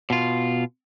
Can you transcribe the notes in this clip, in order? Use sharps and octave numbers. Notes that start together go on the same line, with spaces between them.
B2 F4